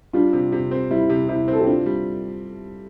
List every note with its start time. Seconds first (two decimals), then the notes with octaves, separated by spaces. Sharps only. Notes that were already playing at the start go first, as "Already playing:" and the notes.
0.13 G3 D4 F4
0.33 C3
0.52 C3
0.71 C4
0.91 G3 E4
1.09 C3
1.29 C3 E4
1.48 C4
1.53 A4
1.60 G4
1.67 C4 D4 F4
1.86 G3